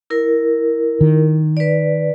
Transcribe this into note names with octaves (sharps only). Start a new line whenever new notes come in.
E4 A#4
D#3
B4 D5